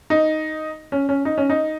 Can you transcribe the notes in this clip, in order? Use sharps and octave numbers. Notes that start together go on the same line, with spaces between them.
D#4
C#4
C#4
D#4
C#4
D#4